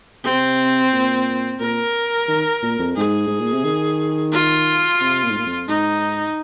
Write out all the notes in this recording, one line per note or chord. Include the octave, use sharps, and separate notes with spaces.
C3 C4
A#2
A#2 A#4
D#3
A#2
F2
G#2 G#4
G#2
A#2
C3
D#3
F4
C3
A#2
G#2
A#2
F2
G#2 D#4